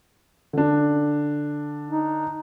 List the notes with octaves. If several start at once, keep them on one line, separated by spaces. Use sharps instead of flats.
D3 D4
D#4